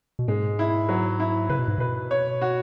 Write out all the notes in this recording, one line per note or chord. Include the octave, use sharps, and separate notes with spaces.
B2
G#2 G#3
E4
F#3
E4
C#3 B4
B2
G#2
B2 B4
C#5
F#4